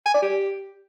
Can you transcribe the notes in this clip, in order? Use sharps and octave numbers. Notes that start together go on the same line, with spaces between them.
G#5
D5
G4